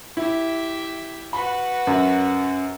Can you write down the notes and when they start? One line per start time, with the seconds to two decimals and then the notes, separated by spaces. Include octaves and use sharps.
0.17 E4 G4 E5
1.33 F#4 B4 B5
1.87 F#2